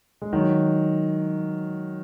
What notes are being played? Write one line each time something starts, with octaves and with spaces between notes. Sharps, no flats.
G#3
D#3 F#3